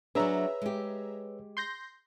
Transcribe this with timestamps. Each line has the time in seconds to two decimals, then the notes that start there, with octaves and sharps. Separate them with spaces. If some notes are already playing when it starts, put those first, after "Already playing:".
0.15 F#3 D4 G#4 B4 C#5 E5 A#5 E6
0.62 G#3 G4
1.57 C6 G6 A#6